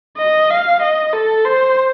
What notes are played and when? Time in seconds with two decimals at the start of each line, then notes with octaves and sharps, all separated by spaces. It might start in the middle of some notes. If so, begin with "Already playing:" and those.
0.18 D#5
0.50 F5
0.82 D#5
1.13 A4
1.45 C5